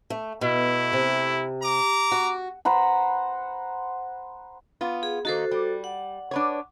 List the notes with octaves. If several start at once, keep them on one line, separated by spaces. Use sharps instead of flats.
A3
B2 A3 E4
C3
A#5 D6
F#4
C5 F#5 A#5 B5
B3 F4
G#4
D#3 A#3 D#4 F#4 A4 C5
G3
F#5
D4 B4 C#5